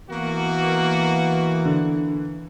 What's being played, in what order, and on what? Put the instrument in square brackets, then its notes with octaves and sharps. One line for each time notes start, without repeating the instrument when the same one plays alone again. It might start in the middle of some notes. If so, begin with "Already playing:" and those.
[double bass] E3 [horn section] A#3 B3 F#4
[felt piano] D3